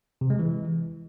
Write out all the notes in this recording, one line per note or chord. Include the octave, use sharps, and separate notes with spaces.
C3
G#3
E3